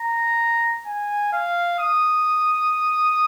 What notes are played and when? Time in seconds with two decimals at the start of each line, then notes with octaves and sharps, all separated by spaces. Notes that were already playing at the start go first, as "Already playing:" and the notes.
Already playing: A#5
0.86 G#5
1.33 F5
1.79 D#6